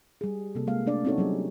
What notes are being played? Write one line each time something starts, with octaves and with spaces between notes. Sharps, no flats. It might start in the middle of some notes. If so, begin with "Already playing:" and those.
G3 G#4
C3 A#3 A4
G#3 A#3 F5
A3 D4 D5
C4 C#4 D#4 F#4 A4 C#5
F#3 G3 G#4